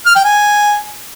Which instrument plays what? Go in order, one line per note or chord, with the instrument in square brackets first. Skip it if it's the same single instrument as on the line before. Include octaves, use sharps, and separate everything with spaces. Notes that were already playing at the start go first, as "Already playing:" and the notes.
[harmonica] F6
G5
G#5